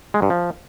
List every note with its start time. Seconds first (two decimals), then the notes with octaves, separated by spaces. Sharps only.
0.14 G#3
0.22 G2
0.30 F3